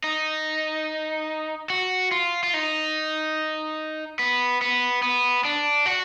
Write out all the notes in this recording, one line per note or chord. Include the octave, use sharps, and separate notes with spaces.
D#4
F#4
F4
F4
D#4
B3
B3
B3
D4
F#4